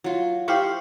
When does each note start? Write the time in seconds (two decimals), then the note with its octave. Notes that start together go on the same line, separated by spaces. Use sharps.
0.04 F#3 F4
0.48 E4 G4 C5 F5 B5 C#6